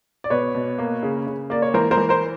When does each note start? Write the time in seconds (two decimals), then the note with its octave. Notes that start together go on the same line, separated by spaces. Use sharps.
0.24 D5
0.30 B2 B4 C#5
0.55 B2
0.79 A#3
1.03 C#3
1.27 C#3
1.50 A#3 D5
1.62 C#5
1.74 E3 A#4 C5
1.91 A#4 C5
1.97 E3
2.09 A#4 C5